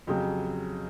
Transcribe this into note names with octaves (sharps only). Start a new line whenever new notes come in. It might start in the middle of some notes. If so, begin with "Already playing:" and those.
F2 C#3 F#3 G4